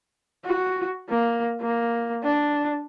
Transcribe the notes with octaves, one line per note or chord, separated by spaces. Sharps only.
F#4
A#3
A#3
D4